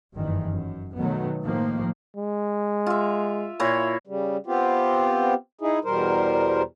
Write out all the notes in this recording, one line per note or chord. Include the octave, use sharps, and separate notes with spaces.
F#1 G2 D#3 E3
F#2
B2 D#3 F#3 A3 B3
A2 D#3 F3 A#3
G#3
F4 E5
A#2 E4 C#5
C#3 G3
B3 C4 F4 G4
D#4 E4 G#4
E2 B2 G3 A#4 C5